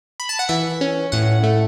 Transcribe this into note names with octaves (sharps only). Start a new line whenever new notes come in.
B5
A5
F#5
E3 E5
C#4
A2 F#5
A3